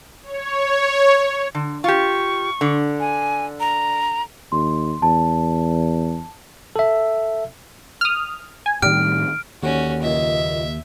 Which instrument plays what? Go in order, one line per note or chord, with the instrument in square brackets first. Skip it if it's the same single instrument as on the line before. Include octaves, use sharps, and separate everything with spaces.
[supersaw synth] C#5
[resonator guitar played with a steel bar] D3
[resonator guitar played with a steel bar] F4 G4 [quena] C#6
[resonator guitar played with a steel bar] D3
[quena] G#5
A#5
[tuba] D#2 [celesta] C6
[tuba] E2 [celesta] A5
[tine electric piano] A4 E5
[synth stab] D#6 F6
G#5
[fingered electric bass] A2 D#3 [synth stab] G3 G4 [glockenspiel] F6 D7
[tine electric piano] D#2 [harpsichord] D3 [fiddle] C#4 F#4
[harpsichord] C#2 F#2 A#2 [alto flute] D#5 [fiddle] E5